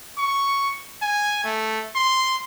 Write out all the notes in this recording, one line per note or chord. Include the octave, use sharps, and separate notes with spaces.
C#6
G#5
A3
C6